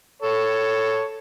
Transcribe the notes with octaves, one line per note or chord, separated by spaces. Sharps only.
A4 C#5